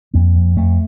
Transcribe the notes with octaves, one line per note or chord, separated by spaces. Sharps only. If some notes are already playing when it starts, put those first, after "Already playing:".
F2 A#3
F2
F2 A3